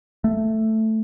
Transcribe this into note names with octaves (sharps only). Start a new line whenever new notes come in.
A3